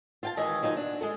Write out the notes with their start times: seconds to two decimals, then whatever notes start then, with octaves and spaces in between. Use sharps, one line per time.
0.23 F4 G5 A5
0.37 D#3 E3 G#3 D#5 G#5
0.62 F#3 D#4 F4 G#5
0.77 D4
1.01 G#3 G#4 A4